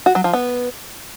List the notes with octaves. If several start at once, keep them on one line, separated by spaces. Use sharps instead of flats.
F#4
F#3
F3
B3